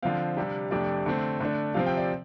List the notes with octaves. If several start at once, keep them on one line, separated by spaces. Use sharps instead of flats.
D3 F3 C4 F5
C3 G3 D4
F2 C3 A3 D4 D5
D3 A3 C4
D3 A3 D4
C3 F3 C4 F5
G5
D5